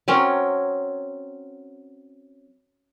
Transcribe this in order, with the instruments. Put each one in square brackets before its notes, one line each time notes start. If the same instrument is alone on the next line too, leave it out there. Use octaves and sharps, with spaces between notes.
[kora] F#3 C4 C#4 A#4